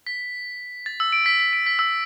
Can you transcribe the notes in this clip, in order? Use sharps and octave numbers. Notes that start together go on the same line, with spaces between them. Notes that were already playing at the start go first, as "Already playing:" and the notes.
B6
A6
E6
D7
B6
B6
D7
B6
E6